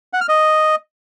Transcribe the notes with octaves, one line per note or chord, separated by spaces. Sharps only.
F#5
F6
D#5